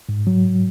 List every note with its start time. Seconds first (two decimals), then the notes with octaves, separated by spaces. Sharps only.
0.09 G#2
0.27 F#3